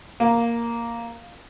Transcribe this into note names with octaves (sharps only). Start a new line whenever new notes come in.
A#3